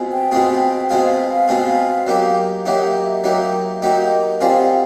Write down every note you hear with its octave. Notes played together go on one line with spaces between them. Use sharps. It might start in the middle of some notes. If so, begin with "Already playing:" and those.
Already playing: B2 G#3 C4 F4 G#4
G5
B2 G#3 C4 F4 G#4
B2 G#3 C4 F4 G#4 F5
B2 G#3 C4 F4 G#4
F#3 A#3 D#4 G4
F#3 A#3 D#4 G4 E5
F#5
E5
D#5
E5
F#3 A#3 D#4 G4
F#3 A#3 D#4 G4 D#5
G3 C4 F4 G#4 F5
F#5